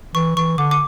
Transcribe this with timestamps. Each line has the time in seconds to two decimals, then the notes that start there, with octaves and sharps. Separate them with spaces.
0.15 E3 C#6
0.36 E3 C#6
0.58 D3 D6
0.71 D6